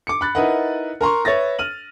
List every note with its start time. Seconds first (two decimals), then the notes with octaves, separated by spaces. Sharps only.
0.07 D6 C#7
0.21 B5 F#6 A6
0.35 D#4 E4 A#4 B4 D#5 F#5
1.01 A#4 A#5 C6 C#6
1.25 B4 C#5 E5 A6 A#6
1.59 F6 D#7 F#7